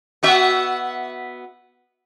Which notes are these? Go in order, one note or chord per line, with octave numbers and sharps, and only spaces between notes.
B3 F#4 E5